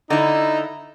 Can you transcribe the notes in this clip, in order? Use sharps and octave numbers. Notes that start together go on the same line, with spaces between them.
D3 D#4 E4